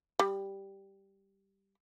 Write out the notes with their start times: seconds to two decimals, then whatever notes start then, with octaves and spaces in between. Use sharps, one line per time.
0.19 G3